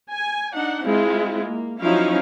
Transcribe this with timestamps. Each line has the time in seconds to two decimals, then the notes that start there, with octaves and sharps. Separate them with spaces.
0.11 G#5
0.54 D4 D#4 F#5
0.85 G#3 C4 E4 F4
1.46 A#3
1.80 F3 F#3 C#4 D#4 E4 F5